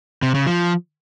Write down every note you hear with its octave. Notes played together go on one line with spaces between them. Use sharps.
C3
C#3
F3